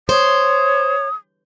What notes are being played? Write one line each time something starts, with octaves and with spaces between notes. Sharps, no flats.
C5 C#5 D#6